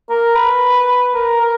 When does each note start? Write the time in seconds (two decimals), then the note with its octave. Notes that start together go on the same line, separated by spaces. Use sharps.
0.10 A#4
0.35 B4
1.14 A#4
1.41 A#4